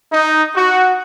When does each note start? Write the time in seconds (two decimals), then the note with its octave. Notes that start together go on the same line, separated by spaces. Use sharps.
0.12 D#4
0.55 F#4